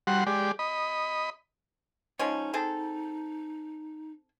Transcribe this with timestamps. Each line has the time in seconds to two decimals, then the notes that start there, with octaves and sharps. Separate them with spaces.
0.07 G3 F#4 F#5 C6
0.27 G#3 G4 D5
0.59 D#5 B5
2.19 F3 G#3 C#4 D#4
2.53 C4 G#4 A4